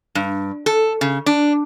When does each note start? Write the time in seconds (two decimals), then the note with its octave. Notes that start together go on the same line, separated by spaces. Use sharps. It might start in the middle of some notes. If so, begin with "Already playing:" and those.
0.15 G2
0.66 A4
1.01 C#3
1.26 D4